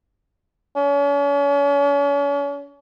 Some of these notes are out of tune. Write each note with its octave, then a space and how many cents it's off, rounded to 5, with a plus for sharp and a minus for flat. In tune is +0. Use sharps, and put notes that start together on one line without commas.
C#4 +40